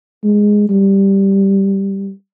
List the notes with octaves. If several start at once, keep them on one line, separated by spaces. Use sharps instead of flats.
G#3
G3